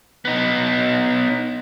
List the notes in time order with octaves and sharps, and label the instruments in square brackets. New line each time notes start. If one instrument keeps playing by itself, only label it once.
[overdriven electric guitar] B3 D#4